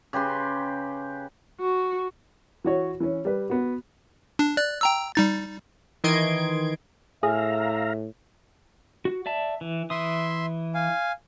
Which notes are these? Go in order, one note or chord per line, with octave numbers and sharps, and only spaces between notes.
C#3 G4 B4 C6
F#4
E3 F#4 C#5
E3 C#4
G3 B4
B3 F#4
D4
D5 F#6
G5 A#5 E6
G3 D#4 A6
D#3 E3 D#5 C6 G#6 D7
A2 G#4 E5 F5 A#5
F#4
D5 E5 A5
E3
E3 E5 C6 D#6
F5 G#5